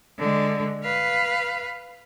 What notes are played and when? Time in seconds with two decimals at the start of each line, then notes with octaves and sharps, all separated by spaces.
0.18 D3 G#3
0.83 B4 F5